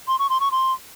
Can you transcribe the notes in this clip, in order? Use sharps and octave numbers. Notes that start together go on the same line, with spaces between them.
C6
C#6
C6
C#6
C6